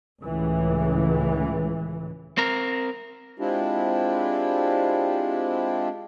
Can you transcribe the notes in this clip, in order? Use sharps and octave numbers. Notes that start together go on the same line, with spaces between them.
C#2 A2 E3
C4 A#4
G#3 C4 D4 E4 F4 G4